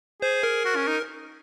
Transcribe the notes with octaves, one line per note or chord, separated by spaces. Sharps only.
G#4 C5
A#4
F#4
C#4
D#4